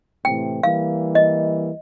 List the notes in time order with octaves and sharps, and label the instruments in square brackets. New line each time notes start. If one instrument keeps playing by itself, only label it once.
[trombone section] A2 C3 E3 [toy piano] G5
[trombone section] E3 G3 A#3 [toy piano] F5
[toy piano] D#5